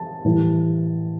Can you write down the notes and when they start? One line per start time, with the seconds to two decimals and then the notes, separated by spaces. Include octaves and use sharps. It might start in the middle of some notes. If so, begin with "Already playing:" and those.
Already playing: A5
0.24 A2 E3 G3